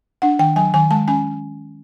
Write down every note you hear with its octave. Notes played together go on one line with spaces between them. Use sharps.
D4 F#5
D#3 G5
F#3 G#5
D#3 G#5
G#3 A5
C#4 G#5